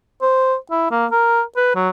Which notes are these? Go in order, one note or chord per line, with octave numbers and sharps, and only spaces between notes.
C5
E4
A#3
A#4
B4
F#3